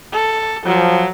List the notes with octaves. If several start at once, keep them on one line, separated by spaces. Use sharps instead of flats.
A4
F3 F#3